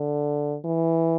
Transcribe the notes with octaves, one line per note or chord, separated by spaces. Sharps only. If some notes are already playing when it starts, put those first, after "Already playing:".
Already playing: D3
E3